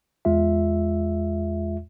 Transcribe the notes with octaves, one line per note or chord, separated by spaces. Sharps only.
E2 G#3 F4 E5